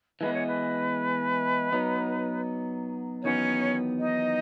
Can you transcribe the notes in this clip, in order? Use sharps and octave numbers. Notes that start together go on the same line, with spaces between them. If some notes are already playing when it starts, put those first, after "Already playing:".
E3 G#3 B3 B4
C#5
B4
F#3 B3 D#4
E2 D#3 F#3 B3 C#4 C#5
D#4 D#5